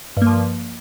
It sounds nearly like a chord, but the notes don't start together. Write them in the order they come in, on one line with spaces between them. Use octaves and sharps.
G2 A#3 F3